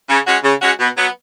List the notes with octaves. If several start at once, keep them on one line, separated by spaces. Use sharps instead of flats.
C#3
G#3 C#4 F#4
C#3
G#3 C#4 F#4
B2
F#3 B3